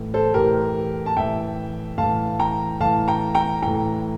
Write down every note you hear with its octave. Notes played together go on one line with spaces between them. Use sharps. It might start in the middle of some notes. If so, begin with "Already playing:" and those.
Already playing: A2 E3
A4 C5
A2 E3 G4 A#4
A5
A2 E3 E5 G5
A2 E3 F5 A5
G5 A#5
A2 E3 F5 A5
G5 A#5
G5 A#5
A2 E3 G5 A#5